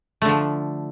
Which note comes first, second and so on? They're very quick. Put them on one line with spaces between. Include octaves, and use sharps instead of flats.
A3 D3 F3